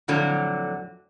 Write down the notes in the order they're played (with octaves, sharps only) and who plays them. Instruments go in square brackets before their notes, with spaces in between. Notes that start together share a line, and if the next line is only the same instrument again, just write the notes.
[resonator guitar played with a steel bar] F2 A2 D3 F#3